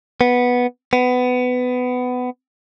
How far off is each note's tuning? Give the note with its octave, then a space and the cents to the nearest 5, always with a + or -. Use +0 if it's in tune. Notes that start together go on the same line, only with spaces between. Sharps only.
B3 -5
B3 +20